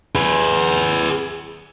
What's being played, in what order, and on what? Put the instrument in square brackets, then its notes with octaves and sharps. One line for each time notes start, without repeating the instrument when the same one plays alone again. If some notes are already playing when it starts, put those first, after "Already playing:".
[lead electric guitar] G#4 B4